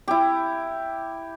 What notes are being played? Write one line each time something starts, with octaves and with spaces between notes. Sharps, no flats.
E4 G4